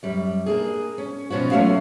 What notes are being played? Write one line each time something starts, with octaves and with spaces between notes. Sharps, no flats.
F#2 G3
A#3 D4 G#4
C#4
B2 F3 C#4 F#4
F#3 A3 C#4 F4 F#4 F5